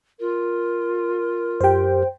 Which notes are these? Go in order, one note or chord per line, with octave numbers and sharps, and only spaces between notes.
F4 A#4
F#2 G4 C5 G5